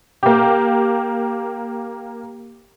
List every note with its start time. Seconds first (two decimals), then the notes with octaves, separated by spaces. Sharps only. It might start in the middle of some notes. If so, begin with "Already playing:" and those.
0.23 A#3 G4